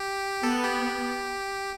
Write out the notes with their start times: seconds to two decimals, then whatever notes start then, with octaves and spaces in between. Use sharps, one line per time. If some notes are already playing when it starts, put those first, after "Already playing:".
Already playing: G4
0.43 B3 A4
0.64 G4